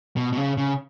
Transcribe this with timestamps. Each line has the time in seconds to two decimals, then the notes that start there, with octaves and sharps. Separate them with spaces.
0.17 B2
0.33 B2
0.37 C#3
0.57 C#3